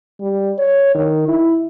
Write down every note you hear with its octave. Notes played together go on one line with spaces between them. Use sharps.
G3
C#5
D#3
E4